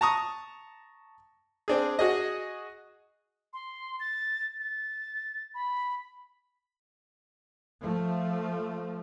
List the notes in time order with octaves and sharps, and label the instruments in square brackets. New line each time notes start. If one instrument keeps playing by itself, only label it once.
[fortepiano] A5 A#5 C#6 D#6
C4 D4 G#4
F#4 G#4 D#5
[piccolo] C6
A6
A6
B5
[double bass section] F3 A3